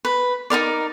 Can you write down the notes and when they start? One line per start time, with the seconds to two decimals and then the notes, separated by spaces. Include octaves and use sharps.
0.05 B4
0.50 D#4 E4 A#4 D5